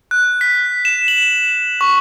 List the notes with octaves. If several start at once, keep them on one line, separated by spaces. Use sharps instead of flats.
F#6
B6
E7
F#7
C#6